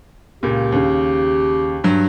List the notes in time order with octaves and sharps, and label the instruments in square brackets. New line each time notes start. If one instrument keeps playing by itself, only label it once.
[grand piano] C#2 A#2 [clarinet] G4
[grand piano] D#2 C#3
G2 F#3